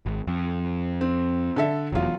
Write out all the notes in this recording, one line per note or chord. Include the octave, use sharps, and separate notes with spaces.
G#1
F2
C4
D3 A4 E5
F1 E2 F#3 F4